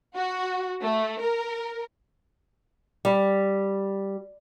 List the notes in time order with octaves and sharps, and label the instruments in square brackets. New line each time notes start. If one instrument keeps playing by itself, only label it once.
[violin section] F#4
A3
A#4
[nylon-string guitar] G3